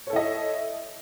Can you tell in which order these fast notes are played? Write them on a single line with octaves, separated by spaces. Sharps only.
C#5 A4 E4 D#5 E5